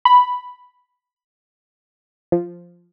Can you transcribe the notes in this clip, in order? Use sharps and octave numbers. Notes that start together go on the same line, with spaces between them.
B5
F3